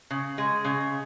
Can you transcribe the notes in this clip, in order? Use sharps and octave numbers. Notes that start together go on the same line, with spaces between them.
C#3
G#3
C#3